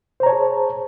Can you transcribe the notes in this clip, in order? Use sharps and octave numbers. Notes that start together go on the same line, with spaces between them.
G#4 C5 C#5 A5 A#5